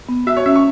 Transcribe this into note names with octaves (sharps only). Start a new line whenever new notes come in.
B3
F#4 E5
C#5
C#4 E5
C#6